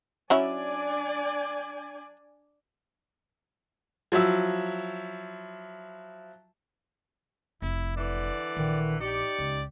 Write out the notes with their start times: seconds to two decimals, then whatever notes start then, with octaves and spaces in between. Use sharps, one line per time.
0.30 F#3 C#4 D4 E4 D5 G#5
4.12 F3 F#3 E4 E5 E6
7.62 F1 E4
7.97 D3 E3 D5
8.57 A#1 D#3
9.01 D#4 G4 D5 C#7
9.38 C#2